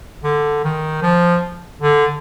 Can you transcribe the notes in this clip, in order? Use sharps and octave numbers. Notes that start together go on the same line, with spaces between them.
D3
D#3
F3
D3